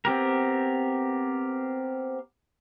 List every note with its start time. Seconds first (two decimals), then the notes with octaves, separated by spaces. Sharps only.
0.05 B3 C4 G4 A#4